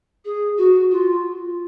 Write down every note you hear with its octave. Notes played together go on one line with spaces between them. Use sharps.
G#4
F#4
F4